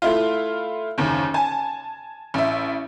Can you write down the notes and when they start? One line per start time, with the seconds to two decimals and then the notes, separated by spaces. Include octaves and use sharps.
0.02 A3 E4 F4
0.98 F#1 D#2
1.34 G#5 A5
2.34 A1 E5